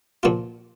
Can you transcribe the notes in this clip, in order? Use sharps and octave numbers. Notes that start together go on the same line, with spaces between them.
A#2 F3 A#3 F4